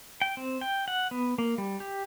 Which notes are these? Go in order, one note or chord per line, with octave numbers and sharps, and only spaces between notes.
G5
C4
G5
F#5
B3
A#3
G3
G4